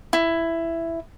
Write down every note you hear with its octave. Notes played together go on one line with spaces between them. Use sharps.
E4